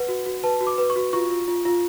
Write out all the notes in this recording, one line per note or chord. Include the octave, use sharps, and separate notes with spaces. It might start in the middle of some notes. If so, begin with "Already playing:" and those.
Already playing: B4 F#5
F#4
F#4
B4 A5
F#4
D6
B4
C#6
F#4
F4 C#6
F4
F4
F4